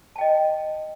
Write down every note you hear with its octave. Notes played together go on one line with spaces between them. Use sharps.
D#5 G5 A5